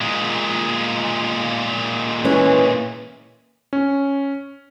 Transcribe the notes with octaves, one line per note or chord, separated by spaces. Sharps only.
A#2 G#3
E3 C#4
C#4